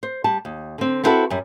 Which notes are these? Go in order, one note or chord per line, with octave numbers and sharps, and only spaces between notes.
C5
G3 A5
D#2
D3 C4
B3 C4 E4 F#4 A4 B4
F#2 G3